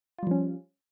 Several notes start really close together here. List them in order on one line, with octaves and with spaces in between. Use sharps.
F4 G3 F3 C#4